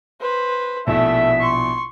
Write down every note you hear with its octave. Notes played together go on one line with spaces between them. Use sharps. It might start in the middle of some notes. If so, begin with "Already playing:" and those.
B4 C5
A#1 B2 A3 E4 E5
C6 C#6